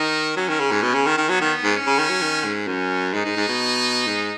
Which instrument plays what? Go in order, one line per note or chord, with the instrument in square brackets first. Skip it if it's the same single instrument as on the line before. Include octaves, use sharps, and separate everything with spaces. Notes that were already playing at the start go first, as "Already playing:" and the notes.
Already playing: [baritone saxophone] D#3 [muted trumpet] D#4
[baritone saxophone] F#3 [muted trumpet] C#4
[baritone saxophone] D#3
C#3
G#2
B2
C#3
D#3
D#3
[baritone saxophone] F#3 [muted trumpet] B3
[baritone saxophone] D#3
G#2
[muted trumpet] C#4
[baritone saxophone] C#3
D#3
F#3
D#3
G#2
[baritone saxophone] F#2 [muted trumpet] C#4
[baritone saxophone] G#2 [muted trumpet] D#4
[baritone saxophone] G#2
G#2
B2
G#2